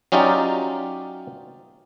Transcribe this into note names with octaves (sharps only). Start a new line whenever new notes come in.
F#3 C#4 D#4 F4 G4 D5